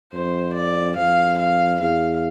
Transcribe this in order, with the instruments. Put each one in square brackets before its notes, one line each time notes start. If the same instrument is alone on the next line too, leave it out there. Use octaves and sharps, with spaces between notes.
[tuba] F2 [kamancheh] C5
[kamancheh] D5
[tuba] F2 [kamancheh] F5
[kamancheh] F5
[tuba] E2 [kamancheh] F5